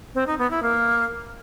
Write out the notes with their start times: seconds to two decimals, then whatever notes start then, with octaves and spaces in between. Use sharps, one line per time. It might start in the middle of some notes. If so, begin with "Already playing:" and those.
0.15 C4
0.27 D#4
0.39 B3
0.51 E4
0.63 A#3